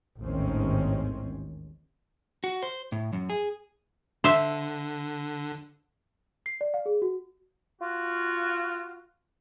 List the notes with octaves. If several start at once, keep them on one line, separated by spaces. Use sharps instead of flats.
A1 D#2 G#2 D#3 C4 C#4
F#4
C5
A2
F#2
G#4
D3 C5 E5
C7
D5
F5
G#4
F#4
F4 F#4